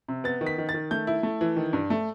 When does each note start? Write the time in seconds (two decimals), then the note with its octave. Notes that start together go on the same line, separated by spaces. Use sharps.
0.08 C3
0.24 B3 A6
0.41 D#3
0.47 B6
0.58 D#3
0.69 A6
0.74 D#3
0.91 A3 G6
1.07 E4
1.23 A3
1.41 E3
1.56 D#3
1.73 G2
1.90 A3